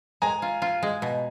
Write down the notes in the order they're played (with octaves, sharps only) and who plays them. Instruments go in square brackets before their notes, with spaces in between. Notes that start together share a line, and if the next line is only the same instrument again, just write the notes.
[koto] G#3 [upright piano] G#5 A#5
[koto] F4
F4
G#3
B2